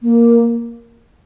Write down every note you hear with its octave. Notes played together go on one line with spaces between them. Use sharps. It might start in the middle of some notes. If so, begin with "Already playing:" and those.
A#3